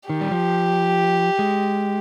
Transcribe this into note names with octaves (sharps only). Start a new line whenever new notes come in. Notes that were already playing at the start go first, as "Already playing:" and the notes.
D#3 G4
G3
F3
G#3